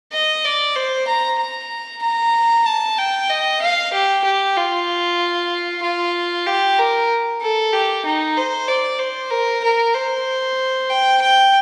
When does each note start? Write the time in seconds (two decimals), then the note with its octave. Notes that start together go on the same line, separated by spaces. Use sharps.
0.13 D#5
0.45 D5
0.76 C5
1.07 A#5
1.39 A#5
2.02 A#5
2.66 A5
2.98 G5
3.30 D#5
3.62 F5
3.93 G4
4.24 G4
4.57 F4
5.82 F4
6.47 G4
6.78 A#4
7.42 A4
7.73 G4
8.05 D#4
8.37 C5
8.68 D5
8.99 C5
9.31 A#4
9.64 A#4
9.94 C5
10.90 G5
11.21 G5